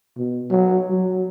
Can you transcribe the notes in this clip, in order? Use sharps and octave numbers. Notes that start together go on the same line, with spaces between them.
B2
F#3
F#3